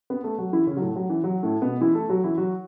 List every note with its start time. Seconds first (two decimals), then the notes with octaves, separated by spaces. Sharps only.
0.10 B3 B4
0.24 A3 A4
0.38 F#3 F#4
0.53 E3 E4
0.67 C#3 C#4
0.77 F#3
0.81 A2 A3
0.96 F#3
1.10 E3
1.24 F#3
1.43 A2 A3
1.62 B2 B3
1.81 E3 E4
1.95 A3 A4
2.09 F#3 F#4
2.24 E3 E4
2.38 F#3 F#4